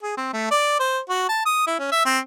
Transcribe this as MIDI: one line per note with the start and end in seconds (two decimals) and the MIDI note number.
0.03 0.14 68
0.17 0.30 60
0.33 0.50 57
0.51 0.79 74
0.80 1.00 72
1.09 1.24 66
1.29 1.45 81
1.46 1.63 87
1.67 1.75 64
1.79 1.87 61
1.92 2.03 76
2.05 2.19 60